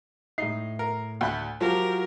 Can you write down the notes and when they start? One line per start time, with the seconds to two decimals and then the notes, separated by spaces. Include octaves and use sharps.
0.38 A2 D#4 C7
0.79 A#4
1.21 D2 B5 F#6
1.61 F3 F#3 F4 G4 A#4